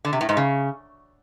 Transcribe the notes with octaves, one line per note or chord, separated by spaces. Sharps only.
D3
C3
A2
G#2
C#3